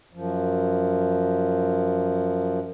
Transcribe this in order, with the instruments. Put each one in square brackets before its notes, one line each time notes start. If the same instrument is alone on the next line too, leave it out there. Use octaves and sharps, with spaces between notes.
[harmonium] F#2 F3